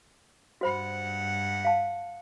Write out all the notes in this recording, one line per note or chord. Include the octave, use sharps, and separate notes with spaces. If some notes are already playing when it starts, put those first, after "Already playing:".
G2 F#4 C5 F#5 B5
F5 A5